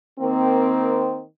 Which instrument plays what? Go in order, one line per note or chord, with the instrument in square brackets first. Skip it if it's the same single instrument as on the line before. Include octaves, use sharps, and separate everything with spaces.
[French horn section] D#3 A#3 C4